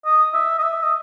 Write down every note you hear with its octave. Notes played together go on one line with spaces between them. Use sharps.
D#5
E5
D#5
E5
D#5